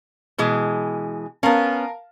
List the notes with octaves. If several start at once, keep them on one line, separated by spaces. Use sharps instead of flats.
B2 E3 G#3
B3 C#4 A#4 F5 A5